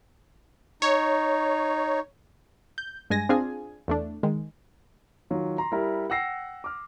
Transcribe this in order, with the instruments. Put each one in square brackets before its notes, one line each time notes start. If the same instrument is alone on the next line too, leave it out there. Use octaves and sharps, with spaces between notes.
[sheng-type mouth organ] D#4 [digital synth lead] C#5
[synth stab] G6
G2 G#3 G#5 A#6
C4 D4 F4 G#4 G#5
E2 A3 D4
D#3 G#3
[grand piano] D#3 F#3 F4
A#5 C6
G3 E4 A#4
F#5 G5 E6 A#6 C7
D6 F6